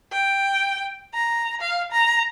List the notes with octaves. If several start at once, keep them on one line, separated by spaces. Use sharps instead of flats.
G5
A#5
F5
A#5